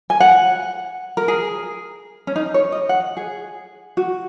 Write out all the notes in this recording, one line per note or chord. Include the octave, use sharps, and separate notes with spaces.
G#5
F#5
A#4
G#4
C#4
D#4
C#5
D#5
F#5
G#4
F#4